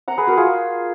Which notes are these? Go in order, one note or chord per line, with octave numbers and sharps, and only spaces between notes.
F#5 A#5
G#4 B4
F#4 A#4
F4 G#4